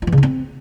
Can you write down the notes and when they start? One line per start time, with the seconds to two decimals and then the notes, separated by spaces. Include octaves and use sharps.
0.02 F4
0.07 E3
0.12 C#3
0.18 D#4
0.23 C4